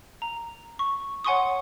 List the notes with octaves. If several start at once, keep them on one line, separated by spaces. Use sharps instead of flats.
A#5
C#6
C#5 F#5 G#5 C6 C#6 D#6